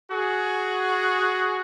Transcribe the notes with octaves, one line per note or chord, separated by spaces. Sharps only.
F#4 G#4